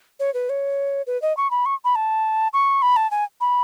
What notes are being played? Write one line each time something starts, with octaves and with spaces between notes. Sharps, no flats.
C#5
B4
C#5
B4
D#5
C#6
B5
C#6
B5
A5
C#6
B5
A5
G#5
B5